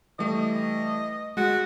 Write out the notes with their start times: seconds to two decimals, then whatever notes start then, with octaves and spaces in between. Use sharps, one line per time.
0.19 E3 G3 A3 D#5
1.37 G#3 F#4